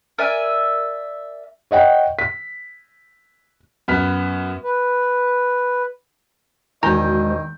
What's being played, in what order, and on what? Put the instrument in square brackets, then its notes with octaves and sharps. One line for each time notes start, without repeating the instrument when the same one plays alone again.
[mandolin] A#4 D5 E5 G#5
[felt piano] C#5 D#5 F#5 G5
B6
[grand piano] F#2 B3 F6 B6
[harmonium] B4
[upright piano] E1 G#5 G6 [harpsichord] D#3 [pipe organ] G#3 F#4 C5 [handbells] A#5